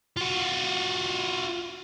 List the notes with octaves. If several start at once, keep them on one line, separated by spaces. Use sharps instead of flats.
F4 F#4